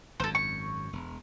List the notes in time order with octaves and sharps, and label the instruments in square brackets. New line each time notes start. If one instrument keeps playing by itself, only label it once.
[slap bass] G#1 F#2 [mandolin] A4 C5
[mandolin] C#6
[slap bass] E1